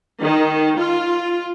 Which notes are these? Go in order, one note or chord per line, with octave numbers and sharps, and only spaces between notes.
D#3
F4